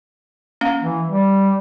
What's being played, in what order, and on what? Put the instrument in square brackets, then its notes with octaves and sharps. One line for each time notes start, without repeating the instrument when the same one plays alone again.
[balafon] A#3 C#4 F5
[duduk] E3
G3